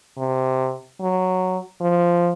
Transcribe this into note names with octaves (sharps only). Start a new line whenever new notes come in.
C3
F#3
F3